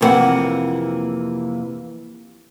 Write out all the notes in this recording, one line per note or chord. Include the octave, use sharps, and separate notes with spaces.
F2 A2 C3 E3 A#3 F#5